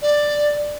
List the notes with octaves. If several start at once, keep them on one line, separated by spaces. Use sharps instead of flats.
D5